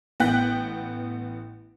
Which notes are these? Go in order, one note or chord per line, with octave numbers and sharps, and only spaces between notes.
A1 B3 G5 F#6 B6